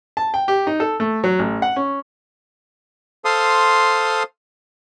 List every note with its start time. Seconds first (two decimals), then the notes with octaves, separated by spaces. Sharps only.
0.17 A5
0.34 G5
0.48 G4
0.67 D#4
0.80 A4
1.00 A3
1.24 F#3
1.39 A1
1.62 F#5
1.76 C#4
3.25 A4 C5 F5 C6 D#6